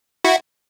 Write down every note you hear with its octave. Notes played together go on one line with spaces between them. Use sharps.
E4 F#4